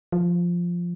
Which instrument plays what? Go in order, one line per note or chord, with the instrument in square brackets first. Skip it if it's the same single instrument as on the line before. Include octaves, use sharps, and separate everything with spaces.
[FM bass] F3